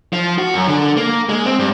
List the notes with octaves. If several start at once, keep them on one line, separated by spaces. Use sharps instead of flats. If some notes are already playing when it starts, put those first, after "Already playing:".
F3
F#4
F#2
D3
A#3
G#3
C4
G2